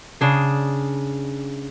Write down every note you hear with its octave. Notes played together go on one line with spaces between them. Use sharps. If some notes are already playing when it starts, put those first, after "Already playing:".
C#3 D4 G#4